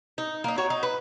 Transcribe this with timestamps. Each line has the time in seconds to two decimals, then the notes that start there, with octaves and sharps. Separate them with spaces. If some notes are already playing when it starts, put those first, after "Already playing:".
0.18 D#4
0.44 A#3 D#4
0.58 F#4 C#5
0.70 D#4
0.83 B4